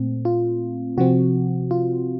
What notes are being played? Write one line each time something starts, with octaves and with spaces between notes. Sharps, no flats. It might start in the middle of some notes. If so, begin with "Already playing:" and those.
Already playing: A#2 A3 C4
F4
C3 F3 C4 F#4
F4